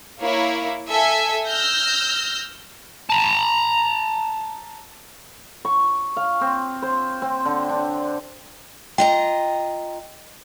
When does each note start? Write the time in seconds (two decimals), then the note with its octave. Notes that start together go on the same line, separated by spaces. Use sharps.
0.20 A#3 E4 C#5
0.90 A4 E5 G#5
1.47 E6 F6 G6 A#6
3.10 A5 A#5
5.65 C#6
6.17 F5
6.41 C4
6.82 C5
7.22 C4
7.45 D3
7.69 D4
8.98 F4 D#5 G5 A#5